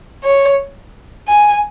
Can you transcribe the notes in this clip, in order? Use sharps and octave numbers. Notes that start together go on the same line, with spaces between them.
C#5
G#5